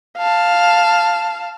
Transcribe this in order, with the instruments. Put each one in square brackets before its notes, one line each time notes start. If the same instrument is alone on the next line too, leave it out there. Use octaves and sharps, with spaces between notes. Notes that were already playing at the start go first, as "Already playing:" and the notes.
[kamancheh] F5 A5